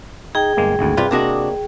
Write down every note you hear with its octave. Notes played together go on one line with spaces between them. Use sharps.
D#4 G#4 G5
G1 G#3 A#3
G#1 D2
G2 C3 F4 B4
C3 A#3 D4 F#4 D#5